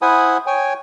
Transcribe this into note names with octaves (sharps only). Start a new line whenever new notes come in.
E4 C5 F#5 G#5 B5 D#6
C#5 G5 G#5